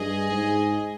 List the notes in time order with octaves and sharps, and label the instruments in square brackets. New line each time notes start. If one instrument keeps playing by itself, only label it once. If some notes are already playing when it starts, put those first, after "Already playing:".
Already playing: [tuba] G2 [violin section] G#4 D#5 G#5
[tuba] G#2